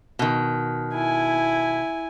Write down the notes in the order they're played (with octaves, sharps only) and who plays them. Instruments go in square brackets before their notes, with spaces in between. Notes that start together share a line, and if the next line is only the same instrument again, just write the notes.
[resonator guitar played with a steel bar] B2 D#3
[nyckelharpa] E4 G#5